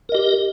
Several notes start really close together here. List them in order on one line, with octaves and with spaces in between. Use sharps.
A#4 D#5 G4